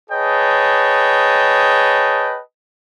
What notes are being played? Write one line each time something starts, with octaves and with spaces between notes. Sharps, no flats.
G#4 B4 C#5 D#5 G5 A5